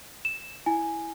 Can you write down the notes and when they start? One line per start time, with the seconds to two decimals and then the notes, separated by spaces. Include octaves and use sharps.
0.25 E7
0.66 E4 G#5